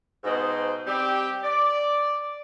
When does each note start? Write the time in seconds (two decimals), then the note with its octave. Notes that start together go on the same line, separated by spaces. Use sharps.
0.24 G#2 B2 D#4 C5
0.85 G3 C4 G4
1.44 D5